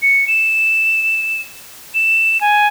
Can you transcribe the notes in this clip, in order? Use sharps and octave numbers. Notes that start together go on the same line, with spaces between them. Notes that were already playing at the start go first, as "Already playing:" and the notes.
C#7
E7
E7
G#5